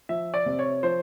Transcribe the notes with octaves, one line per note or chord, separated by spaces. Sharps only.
F3 E5
D5
C3
C#5
F3 C5